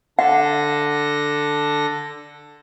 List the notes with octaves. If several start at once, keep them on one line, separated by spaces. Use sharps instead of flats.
D3 A4 F#5 A#6